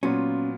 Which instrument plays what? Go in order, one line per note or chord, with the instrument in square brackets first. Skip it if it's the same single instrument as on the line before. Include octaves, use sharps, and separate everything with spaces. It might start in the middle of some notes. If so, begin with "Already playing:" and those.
[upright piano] A#2 F#3 B3 F4 [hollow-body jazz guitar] C#4